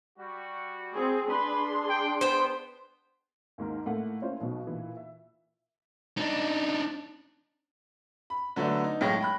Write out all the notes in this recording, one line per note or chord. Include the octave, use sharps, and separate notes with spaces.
G3 F#4
C4 G#4
D4 G#4 B4 B5 C6
G5
B3 C5 G5
D#2 G#2 A#3 A#4
A2 A3 A#3 F#5
A#3 C#4 E4 F4 C5
B1 B2
A#2 E3
E5
D4 D#4
B5
D3 F#3 A3 B3 D4
D#4
B1 A2 G#3 C#5 G5 A#6
G5 B5 F#6